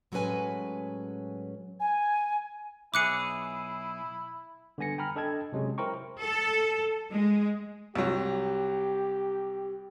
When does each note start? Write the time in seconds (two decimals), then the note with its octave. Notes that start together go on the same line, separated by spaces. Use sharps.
0.12 A2 F#3 G#3 C#4 B4 G#5
1.80 G#5
2.94 B1 E4 G#4 D6 F#6 C#7
4.78 D3 G3 B3 G#5 A#6 C#7
4.98 G5 G#5 A#5 B5 F6
5.16 D4 A4 D#5 G5 A5 G#6
5.52 C3 F#3 G#3 C#4
5.78 E4 A#4 C5 G5 A#5 C#6
6.21 A4
7.13 G#3
7.96 C2 F#3 G4